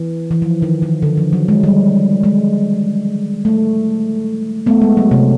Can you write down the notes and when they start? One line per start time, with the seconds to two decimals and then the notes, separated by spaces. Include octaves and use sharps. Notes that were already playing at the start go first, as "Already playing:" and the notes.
Already playing: E3
0.31 E3
0.42 F3
0.62 D#3
0.82 D#3
1.02 D3
1.17 F3
1.33 F#3
1.48 G#3
1.63 G3
2.23 G#3
3.45 A3
4.66 A3 B3
4.82 G#3
4.97 F#3
5.11 C3